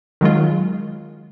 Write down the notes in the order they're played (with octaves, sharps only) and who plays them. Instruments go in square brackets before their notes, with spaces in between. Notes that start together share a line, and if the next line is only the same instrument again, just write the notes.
[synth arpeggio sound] D#3 F#3 G#3 F4